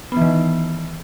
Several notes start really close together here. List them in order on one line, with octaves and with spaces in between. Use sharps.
B3 E3 D#3